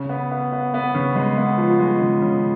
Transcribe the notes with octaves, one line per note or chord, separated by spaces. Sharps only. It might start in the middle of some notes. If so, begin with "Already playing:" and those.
Already playing: C#3
B3
B3
B3
B3
C#3
G#3
B3
F3
G#3
C#3
C#3